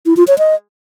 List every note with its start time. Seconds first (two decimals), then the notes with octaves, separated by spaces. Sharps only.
0.06 E4
0.17 F4
0.28 C#5
0.38 D#5